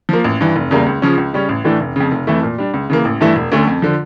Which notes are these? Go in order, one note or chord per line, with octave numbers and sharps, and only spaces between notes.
F3 A#3
A1
G2 E3
F1
E2 C#3 G3 A#3
C#2
C#3 F3 C#4
C#2
C#3 G3 C#4
A1
A2 E3 A3 D4
F1
F2 C#3
F1
F2 E3 A3 E4
A#2
G3 D4
C#2
C#3 E3 A#3
A1
G2 E3 A3 E4
E1
D2 D3 A3 C#4
F2
D3 F3